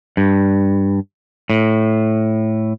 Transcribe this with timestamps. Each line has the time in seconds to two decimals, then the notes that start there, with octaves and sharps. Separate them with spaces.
0.17 G2
1.50 A2